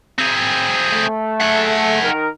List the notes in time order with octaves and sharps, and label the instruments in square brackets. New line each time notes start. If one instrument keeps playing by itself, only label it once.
[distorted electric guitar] C4 G#4
[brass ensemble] A3
[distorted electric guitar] G#4 F#5
[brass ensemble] D#3 A#4